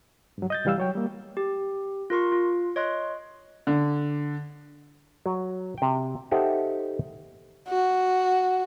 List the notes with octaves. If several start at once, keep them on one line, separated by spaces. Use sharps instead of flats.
G2 F#3
D#5 G6 A6
C2 E3 G3 F5 E6
F#3 C#5 G5
G3 A#3
G4
F4 A#4 C6 C#6
F4
C#5 D#5 C6 F#6
D3
F#3
C3 G5
D#4 G4 A4 C5 E5 F#5
F#4